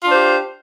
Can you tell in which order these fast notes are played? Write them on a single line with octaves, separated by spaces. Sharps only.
F4 D4 C5 G4